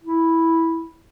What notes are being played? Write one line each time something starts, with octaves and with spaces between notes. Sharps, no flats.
E4